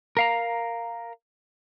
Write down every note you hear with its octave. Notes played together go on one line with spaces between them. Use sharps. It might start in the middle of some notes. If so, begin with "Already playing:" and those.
A#4 F5 A#5